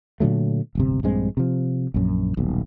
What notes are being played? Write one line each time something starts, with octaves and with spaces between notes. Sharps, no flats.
A#2 D3 F#3 A3
D1 G1 C3
A#1 G2 G#3 C4
C3 F3
A#1 F#2
D#1 B1